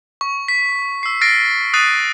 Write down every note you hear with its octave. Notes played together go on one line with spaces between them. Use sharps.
C#6
B6
E6 C7
F6 A6 A#6 C7 D7
D#6 F#6 A6 C7 D#7